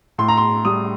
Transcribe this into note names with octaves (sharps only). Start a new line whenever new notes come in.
A2 C6
A#5
C6
G3 D#6